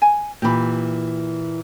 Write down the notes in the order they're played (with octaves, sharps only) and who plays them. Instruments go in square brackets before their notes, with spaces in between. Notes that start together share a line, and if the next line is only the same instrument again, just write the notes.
[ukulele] G#5
[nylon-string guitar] A#2 E3 [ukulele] G4 B5